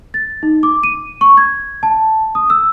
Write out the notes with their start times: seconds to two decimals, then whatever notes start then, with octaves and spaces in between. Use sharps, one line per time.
0.14 A6
0.43 D#4
0.63 D6
0.83 D#7
1.21 C#6
1.37 G#6
1.83 A5
2.35 D#6
2.50 E6